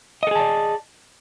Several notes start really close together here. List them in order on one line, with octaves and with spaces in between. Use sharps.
D#5 A4 G#4 A5 D5